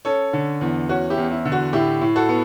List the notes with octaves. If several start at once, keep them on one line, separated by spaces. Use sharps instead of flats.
C#4 A4 C#5
D3
E2
C#4 F#4
E4 G4
E2
E4
D3
F#4
A2 E4 G4
A2
F#4 A4
B3